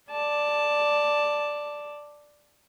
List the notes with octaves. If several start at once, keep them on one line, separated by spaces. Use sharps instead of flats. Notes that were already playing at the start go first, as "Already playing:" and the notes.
D5 A5